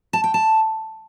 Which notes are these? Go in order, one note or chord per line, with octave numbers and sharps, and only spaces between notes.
A5
G5
A5